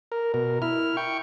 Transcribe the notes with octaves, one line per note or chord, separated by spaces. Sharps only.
A#4
B2 A#4
E4 F6
G5 C#6